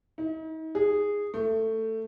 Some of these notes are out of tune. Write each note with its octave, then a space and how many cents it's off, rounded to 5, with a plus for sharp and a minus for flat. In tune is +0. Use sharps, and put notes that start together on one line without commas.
D#4 +40
G#4 -10
A3 +15